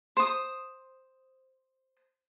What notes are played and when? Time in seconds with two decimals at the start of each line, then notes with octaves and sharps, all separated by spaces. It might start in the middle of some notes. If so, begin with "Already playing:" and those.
0.17 C5 D#6